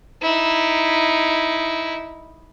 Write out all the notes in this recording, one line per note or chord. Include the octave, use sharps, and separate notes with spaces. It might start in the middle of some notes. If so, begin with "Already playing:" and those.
D#4 E4